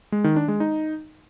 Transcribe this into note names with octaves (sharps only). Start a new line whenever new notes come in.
G#3
D#3
D4
G#3
D#4